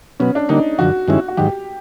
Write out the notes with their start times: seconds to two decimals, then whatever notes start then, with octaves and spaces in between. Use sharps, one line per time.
0.20 B2 F#3 B3 C#4
0.35 D4
0.49 D3 G3 A#3 D4 D#4
0.79 F#2 D3 F3 F#4
1.08 G2 D#3 G#3 C#4 E4
1.28 F#4
1.37 G#2 D#3 F#3 G4